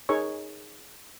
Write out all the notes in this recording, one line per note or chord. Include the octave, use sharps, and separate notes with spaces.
D#4 G#4 A#4 C#5 C#6